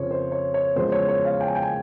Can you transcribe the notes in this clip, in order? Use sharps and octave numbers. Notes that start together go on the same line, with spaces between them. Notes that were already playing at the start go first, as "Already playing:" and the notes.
Already playing: F2 C#3 F3 C5 C#5
C5
C#5
C#5
E2 C#3 F3 G#3 C5
C#5
C#5
F5
G5
G#5
G5
G#5